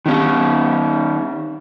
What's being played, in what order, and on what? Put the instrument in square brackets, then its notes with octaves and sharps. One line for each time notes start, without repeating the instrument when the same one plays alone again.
[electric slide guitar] D#3 C#4